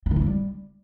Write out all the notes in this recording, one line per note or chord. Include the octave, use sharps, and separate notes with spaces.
C4
D#3
E4
F#3
G3